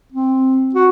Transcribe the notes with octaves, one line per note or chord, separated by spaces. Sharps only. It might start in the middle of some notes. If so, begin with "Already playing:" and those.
C4
F#4